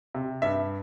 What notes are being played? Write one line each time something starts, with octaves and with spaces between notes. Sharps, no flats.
C3
G2 E5